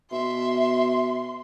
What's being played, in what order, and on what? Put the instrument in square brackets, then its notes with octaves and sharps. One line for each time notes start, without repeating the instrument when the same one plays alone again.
[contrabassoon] B2 [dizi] E5 [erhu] C6